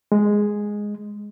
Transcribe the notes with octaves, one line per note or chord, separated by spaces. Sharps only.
G#3